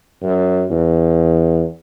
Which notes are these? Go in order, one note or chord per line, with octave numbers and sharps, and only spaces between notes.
F#2
E2